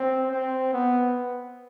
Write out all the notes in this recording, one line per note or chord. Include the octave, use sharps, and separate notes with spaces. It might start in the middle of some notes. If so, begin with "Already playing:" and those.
Already playing: C4
C4
B3